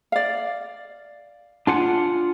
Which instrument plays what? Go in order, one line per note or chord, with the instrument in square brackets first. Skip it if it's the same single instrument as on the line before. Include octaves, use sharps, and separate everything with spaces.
[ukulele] D5 F5
[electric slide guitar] D4 F4 F#5 [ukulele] G#5